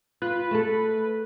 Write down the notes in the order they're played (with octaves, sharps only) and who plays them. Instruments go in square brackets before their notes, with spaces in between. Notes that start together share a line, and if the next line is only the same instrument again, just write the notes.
[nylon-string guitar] F4 [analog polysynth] B4
[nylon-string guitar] A3 A4